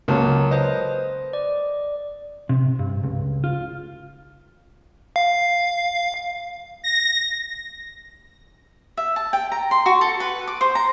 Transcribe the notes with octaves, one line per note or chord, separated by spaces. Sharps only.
C#2 F#3 A#3 F#5 A5
B4 C5 D#5
D5
C3
G2
C#2
F4
F5
A#6
E5
A5
G5
A#5
C6
F#4
A4
B4
D6
C5
A#5